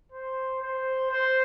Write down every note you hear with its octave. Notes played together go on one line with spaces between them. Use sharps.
C5
C5
C5